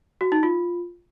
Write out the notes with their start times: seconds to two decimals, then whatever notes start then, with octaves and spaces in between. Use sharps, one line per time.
0.21 F#4
0.32 D#4
0.43 F4